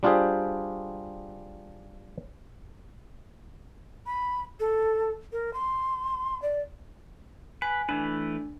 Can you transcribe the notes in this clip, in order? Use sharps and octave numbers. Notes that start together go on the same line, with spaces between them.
G3 D4 F4 G4 G#4 C5
B5
A4
A#4
C6
D5
B4 G#5
E3 A3 D4 B4